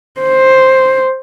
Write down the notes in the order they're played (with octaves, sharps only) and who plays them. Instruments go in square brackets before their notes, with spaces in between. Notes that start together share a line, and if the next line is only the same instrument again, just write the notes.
[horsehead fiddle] C5